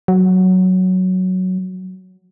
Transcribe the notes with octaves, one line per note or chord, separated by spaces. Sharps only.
F#3